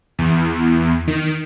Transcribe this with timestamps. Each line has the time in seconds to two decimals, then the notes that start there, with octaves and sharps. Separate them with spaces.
0.19 E2
1.08 D#3